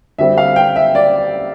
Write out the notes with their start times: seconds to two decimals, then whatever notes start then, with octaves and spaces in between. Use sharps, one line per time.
0.18 D3 G3 C4 E5
0.38 F5
0.56 G5
0.76 E5
0.95 D5